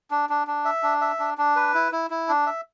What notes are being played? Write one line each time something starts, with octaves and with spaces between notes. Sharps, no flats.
D4
D4
D4
E5
D4
E5
D4
D4
B4
E4
E4
E4
D4
E5